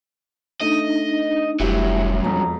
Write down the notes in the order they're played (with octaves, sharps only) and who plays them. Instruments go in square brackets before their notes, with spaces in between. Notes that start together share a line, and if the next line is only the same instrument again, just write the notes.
[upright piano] A3 [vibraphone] D4 D#4 [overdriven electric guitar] D#5
[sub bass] F1 [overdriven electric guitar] G2 F#3 [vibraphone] A3 E5 [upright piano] E4 G4
[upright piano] E1 F2 [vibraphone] A#5